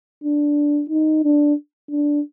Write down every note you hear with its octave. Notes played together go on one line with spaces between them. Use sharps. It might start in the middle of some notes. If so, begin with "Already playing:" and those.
D4
D#4
D4
D4